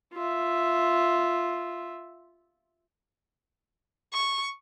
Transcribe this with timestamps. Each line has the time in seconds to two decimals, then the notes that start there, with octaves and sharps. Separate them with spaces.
0.14 F4 E5
4.13 C#6